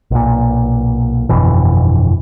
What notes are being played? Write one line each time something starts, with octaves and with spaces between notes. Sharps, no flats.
B1 A#2
G1 F2 B2 E3